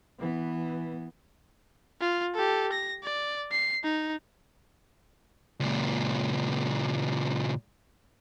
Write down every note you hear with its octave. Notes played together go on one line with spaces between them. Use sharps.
E3 B3
F4
G4 A4
A#6
D5
C7
D#4
C#2 A#2